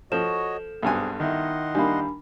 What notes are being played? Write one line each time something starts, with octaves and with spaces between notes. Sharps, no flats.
F3 F#4 A4 C#5 D#5 E7
B1 G2 C4 G#4 G#5
D#3 E4 D#5 F#5 C6
G3 A#3 D4 D#4 B5